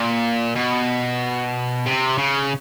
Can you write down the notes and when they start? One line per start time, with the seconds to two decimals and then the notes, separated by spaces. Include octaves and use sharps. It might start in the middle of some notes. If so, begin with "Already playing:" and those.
Already playing: A#2
0.56 B2
1.86 C3
2.18 C#3